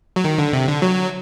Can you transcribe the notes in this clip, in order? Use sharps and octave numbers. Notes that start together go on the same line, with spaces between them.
F#3
D#3
D3
C3
D3
F#3